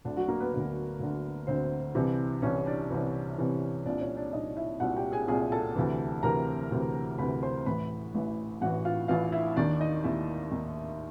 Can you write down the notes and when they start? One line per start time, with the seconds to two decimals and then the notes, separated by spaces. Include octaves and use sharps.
0.05 D2 D3 D4
0.17 F#3 F#4
0.28 A#3 A#4
0.40 B3 B4
0.52 D2 D3 B3 B4
1.00 D2 D3
1.47 D2 D3 C4 C5
1.95 C2 C3 E3
2.42 C2 C3 E3 C#4 C#5
2.66 D4 D5
2.90 C2 C3 E3
3.38 C2 C3 E3
3.85 C2 A#2 D4 D5
4.01 C#4 C#5
4.17 D4 D5
4.33 C2 A#2 D#4 D#5
4.57 E4 E5
4.80 C2 A#2 F#4 F#5
4.96 G4 G5
5.12 G#4 G#5
5.28 C2 A#2 G#4 G#5
5.52 A4 A5
5.76 D2 C3 E3
6.23 D2 C3 E3 A#4 A#5
6.71 D2 C3 E3
7.18 D2 C3 E3 B4 B5
7.42 C5 C6
7.66 A1 A2 E3 B4 B5
8.14 A1 A2 E3
8.61 A1 A2 E3 F#4 F#5
8.85 F4 F5
9.08 A1 A2 E3 F4 F5
9.32 E4 E5
9.56 D#2 D#3 D4 D5
9.80 D#4 D#5
10.04 D#2 D#3 E4 E5
10.52 D#2 D#3